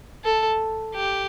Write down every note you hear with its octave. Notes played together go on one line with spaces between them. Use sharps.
A4
G4